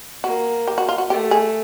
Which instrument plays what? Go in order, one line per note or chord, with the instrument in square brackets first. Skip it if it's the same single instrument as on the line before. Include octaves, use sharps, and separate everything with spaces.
[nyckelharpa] A#3 [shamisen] F#4
[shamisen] G4
F#4
F4
F#4
[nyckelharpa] A3 [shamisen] G4
[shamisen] G#4